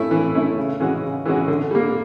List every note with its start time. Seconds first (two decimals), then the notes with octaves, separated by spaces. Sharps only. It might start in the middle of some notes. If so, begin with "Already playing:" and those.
Already playing: A3 C#4 E4
0.11 E3
0.35 A3 C#4 E4
0.58 C#3
0.80 E3 G#3 C#4 F#4
1.03 C#3
1.26 E3 G#3 C#4 F#4
1.48 D3
1.71 G3 A#3